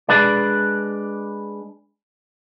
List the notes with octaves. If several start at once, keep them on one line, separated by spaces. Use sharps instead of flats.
G#3 D4 B4 D5